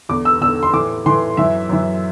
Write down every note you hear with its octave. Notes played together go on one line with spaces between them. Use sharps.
E2 D3 D6
E6
E2 D3 E6
C6
A2 E3 D6
A2 E3 C6
F#2 E3 E5
F#2 E3